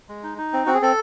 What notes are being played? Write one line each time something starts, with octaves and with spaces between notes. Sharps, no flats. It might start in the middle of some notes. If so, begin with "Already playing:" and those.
G#3
D#4
D#4
C4
C4 F#4
G#4
C4 A4